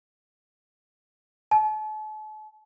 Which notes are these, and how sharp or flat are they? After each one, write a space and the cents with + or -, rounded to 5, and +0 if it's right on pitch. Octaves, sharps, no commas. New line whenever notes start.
A5 -40